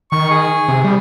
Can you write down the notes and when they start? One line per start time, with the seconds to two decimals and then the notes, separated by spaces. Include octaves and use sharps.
0.12 D#3 C#6
0.31 G#4
0.68 C3
0.84 G3